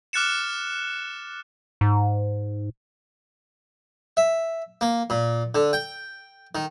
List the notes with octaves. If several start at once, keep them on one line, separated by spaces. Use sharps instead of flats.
D6 F6 F#6 A6 C#7 E7
G#2
E5
A#3
A#2
D3
G5
D#3